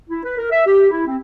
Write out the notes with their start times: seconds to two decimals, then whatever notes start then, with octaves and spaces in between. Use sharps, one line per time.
0.09 E4
0.24 B4
0.38 A#4
0.51 E5
0.66 G4
0.91 E4
1.07 C4